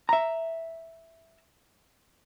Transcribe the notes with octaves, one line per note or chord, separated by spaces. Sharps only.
E5 A#5